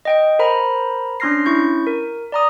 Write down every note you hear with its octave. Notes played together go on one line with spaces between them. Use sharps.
D#5 G5 D7
A#4 C5 A#5 B5
C#4 D4 C6 F6 A#6 C7
C#4 E4 C#6 G6
A#4
D5 A#5 D#6